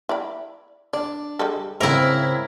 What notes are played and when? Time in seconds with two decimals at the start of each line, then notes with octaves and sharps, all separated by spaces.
0.09 E4 D5 B5
0.93 D4 D5
1.39 G3 G#3 A4
1.81 G#2 C#3 C4 E4 A#4 B4 C#5 E5